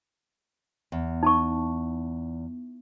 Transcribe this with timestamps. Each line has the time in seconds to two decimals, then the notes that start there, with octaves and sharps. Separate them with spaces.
0.92 E2
1.23 D#4 A5 C#6